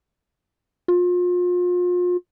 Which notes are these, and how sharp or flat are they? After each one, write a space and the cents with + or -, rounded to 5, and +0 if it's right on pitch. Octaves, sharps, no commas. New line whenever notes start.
F4 +35